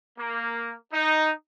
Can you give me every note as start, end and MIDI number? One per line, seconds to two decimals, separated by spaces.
0.19 0.74 58
0.93 1.31 63